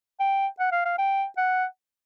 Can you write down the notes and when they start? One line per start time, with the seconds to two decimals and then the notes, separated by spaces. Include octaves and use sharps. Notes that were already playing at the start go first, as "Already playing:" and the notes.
0.20 G5
0.59 F#5
0.72 F5
0.85 F5
0.98 G5
1.38 F#5